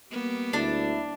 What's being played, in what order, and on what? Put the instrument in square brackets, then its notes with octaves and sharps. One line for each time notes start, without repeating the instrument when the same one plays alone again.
[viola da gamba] G3 A#3 B3
[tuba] D2 [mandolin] D4 A5 [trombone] E4